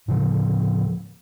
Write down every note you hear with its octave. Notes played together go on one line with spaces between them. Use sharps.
A2 C#3 F3